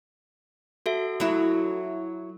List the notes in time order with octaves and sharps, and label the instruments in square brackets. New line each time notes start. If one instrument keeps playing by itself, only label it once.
[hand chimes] F#4 A4 E5
[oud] F#3 E4